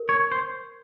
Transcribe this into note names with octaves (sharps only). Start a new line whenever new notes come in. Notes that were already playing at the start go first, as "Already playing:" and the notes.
Already playing: A#4
C#5
C5